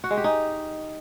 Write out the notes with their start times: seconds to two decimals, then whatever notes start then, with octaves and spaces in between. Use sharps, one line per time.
0.04 F#4
0.10 G#3
0.17 G4
0.24 D#4